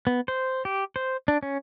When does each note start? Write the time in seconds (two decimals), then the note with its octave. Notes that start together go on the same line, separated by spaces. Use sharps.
0.07 B3
0.28 C5
0.65 G4
0.96 C5
1.28 D4
1.43 C#4